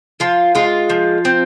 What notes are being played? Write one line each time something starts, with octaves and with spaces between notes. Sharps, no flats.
F3 F4
G#3 F4
F3
C4